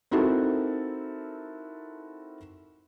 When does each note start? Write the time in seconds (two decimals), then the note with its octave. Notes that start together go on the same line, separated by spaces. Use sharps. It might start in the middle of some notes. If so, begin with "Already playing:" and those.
0.11 C4 D#4 E4 F#4 A4 A#4